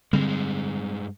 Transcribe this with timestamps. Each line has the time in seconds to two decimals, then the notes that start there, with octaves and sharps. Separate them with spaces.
0.13 G2 D3 G3 G#3 C4